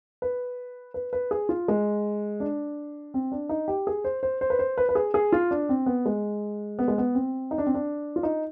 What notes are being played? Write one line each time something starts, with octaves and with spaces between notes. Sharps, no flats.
B4
B4
B4
G#4
F4
G#3
D4
C4
D4
D#4
G4
G#4
C5
C5
C5
B4
C5
B4
B4
G#4
G#4
F4
D4
C4
B3
G#3
B3
G#3
B3
C4
D#4
D4
C4
D4
F4
D#4